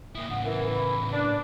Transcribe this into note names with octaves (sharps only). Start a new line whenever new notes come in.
A#3 E4 D#6
A2 C#3 F#5
E3 A#4
B5
D4